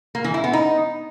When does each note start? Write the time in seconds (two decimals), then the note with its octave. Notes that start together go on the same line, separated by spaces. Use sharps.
0.15 A#3
0.24 E3
0.34 E4
0.44 B3
0.53 D#4